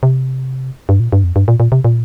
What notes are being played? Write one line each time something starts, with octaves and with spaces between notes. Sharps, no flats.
C3
G2
A#2
G2
F2
G2
A#2
A#2
C3
A#2